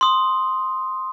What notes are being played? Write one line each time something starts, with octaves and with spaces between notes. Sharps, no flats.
C6 D#6